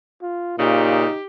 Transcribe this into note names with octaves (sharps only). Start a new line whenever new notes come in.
F4
A#2 C#3 D#4 G4